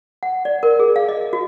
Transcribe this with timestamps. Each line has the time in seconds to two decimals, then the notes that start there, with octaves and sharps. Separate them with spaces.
0.23 F#5
0.45 D5
0.63 A#4
0.80 G#4
0.96 F5
1.09 D#5
1.33 F#4